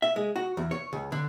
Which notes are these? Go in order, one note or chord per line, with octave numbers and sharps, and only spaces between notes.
E5
G#3
F#4
E2
C#5
C#2
D3